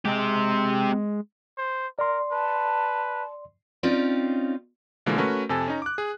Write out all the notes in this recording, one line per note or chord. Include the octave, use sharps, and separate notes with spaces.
G#3 C4 G4
C5
A#4 D5 C6
B4 A5
C4 C#4 D#4 F4 D5
B2 D3 E3 F3 G#3 A#3
A3 C#4 F#4 A#4 B4
F2 C3 A4 G#5 A5
C#4 D#4 A#5
D6 F#6
G#4